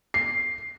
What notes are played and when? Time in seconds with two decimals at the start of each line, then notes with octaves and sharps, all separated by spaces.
0.14 C7